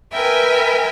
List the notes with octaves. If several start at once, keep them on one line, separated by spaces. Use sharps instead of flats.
A#4 B4 E5 G5 G#5